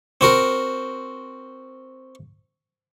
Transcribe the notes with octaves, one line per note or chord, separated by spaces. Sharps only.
C4 F#4 A#4